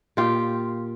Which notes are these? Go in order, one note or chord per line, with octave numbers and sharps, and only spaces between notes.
A#2 F4 G4